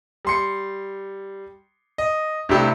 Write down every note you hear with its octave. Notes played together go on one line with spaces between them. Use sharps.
G3 C6 C#7
D#5
G2 C3 A3 D4 E4 G4